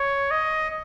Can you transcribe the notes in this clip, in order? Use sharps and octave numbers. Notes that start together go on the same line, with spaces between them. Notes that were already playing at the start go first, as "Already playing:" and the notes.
Already playing: C#5
D#5